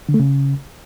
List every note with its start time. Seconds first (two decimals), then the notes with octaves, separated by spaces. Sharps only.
0.09 D3
0.14 A3
0.20 C#3